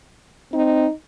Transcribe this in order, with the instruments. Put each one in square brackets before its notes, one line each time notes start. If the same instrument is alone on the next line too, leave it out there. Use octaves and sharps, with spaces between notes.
[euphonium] C4 [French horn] D#4